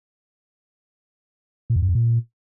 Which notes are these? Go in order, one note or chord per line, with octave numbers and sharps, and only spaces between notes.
A#2
F2
F#2
F2
A#2